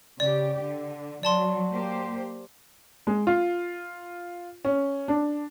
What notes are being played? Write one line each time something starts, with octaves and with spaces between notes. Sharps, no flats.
C#3 G4 D5
D3
F#3 D5 A5 C6
A#3 G4 C5
G#3
F4
C#4
D4